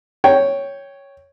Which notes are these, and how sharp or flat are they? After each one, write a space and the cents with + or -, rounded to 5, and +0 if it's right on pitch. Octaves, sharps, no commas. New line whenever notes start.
C#5 +0 G5 +0